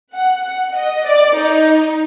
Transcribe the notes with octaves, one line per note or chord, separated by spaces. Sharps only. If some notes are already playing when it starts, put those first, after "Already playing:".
F#5
F#5
D#5
D5
D#4